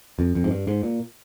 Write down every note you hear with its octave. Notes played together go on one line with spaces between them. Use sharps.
F2
F2
G#2
G2
G#2
A#2